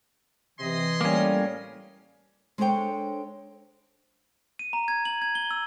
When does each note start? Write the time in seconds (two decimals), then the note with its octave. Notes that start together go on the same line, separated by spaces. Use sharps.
0.59 C3 E3 D#5 G#5 C6
1.01 A2 G3 A#3 C#4
2.58 G#3 D4 A4 C5 C#5 G5
4.59 D#7
4.73 A#5
4.88 G#6
5.05 F#7
5.22 G#6
5.35 G7
5.51 E6